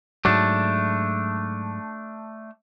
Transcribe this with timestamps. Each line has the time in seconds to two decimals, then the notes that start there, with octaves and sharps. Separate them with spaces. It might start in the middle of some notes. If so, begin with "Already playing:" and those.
0.25 G#2 F#3 A3 D4